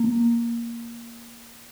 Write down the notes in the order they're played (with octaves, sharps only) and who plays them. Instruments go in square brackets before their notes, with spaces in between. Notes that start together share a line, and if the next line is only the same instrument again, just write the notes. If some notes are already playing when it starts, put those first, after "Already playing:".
Already playing: [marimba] A#3